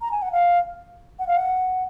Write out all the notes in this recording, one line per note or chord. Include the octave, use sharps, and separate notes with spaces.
A#5
G#5
F#5
F5
F#5
F5
F#5